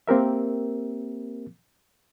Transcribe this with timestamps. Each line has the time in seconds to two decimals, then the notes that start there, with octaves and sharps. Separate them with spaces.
0.08 A#3 C4 G4 A#4 E5